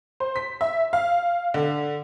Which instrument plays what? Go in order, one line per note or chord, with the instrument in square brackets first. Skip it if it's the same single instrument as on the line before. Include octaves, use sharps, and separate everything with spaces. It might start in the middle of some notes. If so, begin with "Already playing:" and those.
[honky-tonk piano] C5
B6
E5
F5
D3